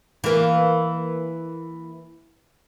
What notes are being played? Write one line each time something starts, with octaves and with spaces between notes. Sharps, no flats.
E3 A#3